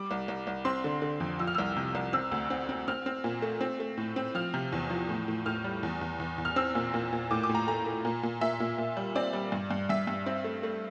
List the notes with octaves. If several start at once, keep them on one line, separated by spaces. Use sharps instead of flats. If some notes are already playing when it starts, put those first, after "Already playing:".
Already playing: G3 D6
C2
C2
C2
C4 C6
D3
D3
F2
F3 E6
F6
C2 E6
C3
C2
C4 E6
D2
C4
C4
C4 F6
C4
A#2
A3
C4
A3
A2
C4
F3 F6
C3
E2
F3
A2
A2
A2 F6
G3
E2
E2
E2
E2
F6
C4 E6
A#2
A#2
A#2
A2 D6
D6
A2
A#5
A3 A#5
A3
A#2
A#2
A#2 E5
A#2
A#2
G3
C4 D5
G3
G2
G2
G2 E5
G2
C4
A3
A3